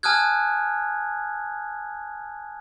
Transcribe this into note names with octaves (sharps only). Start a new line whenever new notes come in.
G#5 A5 D#6 F6 F#6 G#6